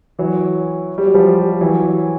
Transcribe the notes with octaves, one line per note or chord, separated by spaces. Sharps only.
E3 F#3
G3
F#3
F3 G3
E3 F#3